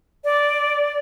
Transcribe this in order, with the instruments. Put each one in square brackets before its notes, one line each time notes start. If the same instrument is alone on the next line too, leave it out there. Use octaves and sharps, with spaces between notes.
[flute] D5